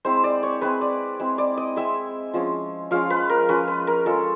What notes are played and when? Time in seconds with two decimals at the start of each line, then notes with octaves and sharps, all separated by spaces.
0.05 G#3 C4 E4 C5
0.24 D5
0.43 C#5
0.61 G#3 C4 E4 B4
0.81 D5
1.20 G#3 C4 E4
1.38 D5
1.57 D#5
1.76 G#3 C4 E4 E5
2.34 F3 G#3 C#4
2.91 F3 G#3 C#4 F5
3.10 B4
3.30 A#4
3.49 F3 G#3 C#4 B4
3.68 B4
3.87 A#4
4.06 F3 G#3 C#4 A4